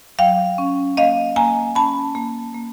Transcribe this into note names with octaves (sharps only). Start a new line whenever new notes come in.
F#3 F5 G5
C#4
A#3 D#5 F5
A#3 G#5 A#5
C#4 A5 B5
A#3
A#3